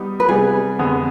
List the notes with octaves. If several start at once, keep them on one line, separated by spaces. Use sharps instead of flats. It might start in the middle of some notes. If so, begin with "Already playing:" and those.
Already playing: G3 B3 D#4 G4
B4
C3 G3 B3 G#4
F2 D3 G#3 B3